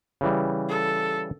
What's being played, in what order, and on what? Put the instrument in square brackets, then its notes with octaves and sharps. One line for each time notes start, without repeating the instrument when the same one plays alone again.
[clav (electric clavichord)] C#3 E3 G3
[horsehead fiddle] A4